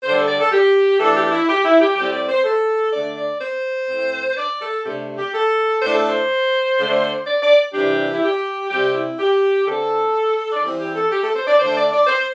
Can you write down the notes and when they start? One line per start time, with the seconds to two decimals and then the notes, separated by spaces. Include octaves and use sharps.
0.03 D3 G3 D4 C5
0.16 A4
0.28 D5
0.40 A4
0.52 G4
0.99 E3 A3 D4 A4
1.16 G4
1.26 G4
1.32 E4
1.48 G4
1.65 E4
1.81 G4
1.96 A2 G3 C4 G4
2.13 D5
2.29 C5
2.44 A4
2.93 D3 A3 D4 D5
3.17 D5
3.41 C5
3.89 A2 A3 C4
4.37 D5
4.61 A4
4.85 C3 A3 D4 G4
5.17 G4
5.34 A4
5.82 A2 A3 D4 C5
5.95 A4
6.09 C5
6.78 D3 A3 D4
7.26 D5
7.43 D5
7.74 C3 E3 G3 D4 G4
8.12 E4
8.23 G4
8.70 C3 G3 C4 G4
8.94 E4
9.19 G4
9.66 D3 C4 A4
10.52 D5
10.63 E3 G3 C4 C5
10.80 G4
10.95 A4
11.11 G4
11.23 A4
11.36 C5
11.47 D5
11.59 D3 A3 D4 C5
11.76 D5
11.92 D5
12.07 C5